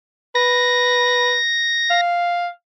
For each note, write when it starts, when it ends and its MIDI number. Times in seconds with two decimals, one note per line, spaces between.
0.35 1.36 71
0.35 2.01 94
1.90 2.48 77